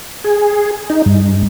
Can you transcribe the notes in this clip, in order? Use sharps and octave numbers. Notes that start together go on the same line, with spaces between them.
G#4
D#4
G2